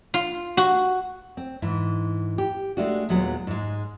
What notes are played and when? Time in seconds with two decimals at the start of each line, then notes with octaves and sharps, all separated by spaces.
0.14 F4
0.57 F#4
1.37 C4
1.62 G#2 E3
2.38 G4
2.77 G#3 A3 D4 F#4
3.09 D#2 A#2 F#3 G#3 B3 F#5
3.47 G#2 G#3